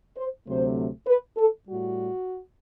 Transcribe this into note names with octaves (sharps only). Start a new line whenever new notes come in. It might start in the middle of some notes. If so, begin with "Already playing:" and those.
C5
D2 C3 F#3 A3 C5
B4
A4
A2 G3 F#4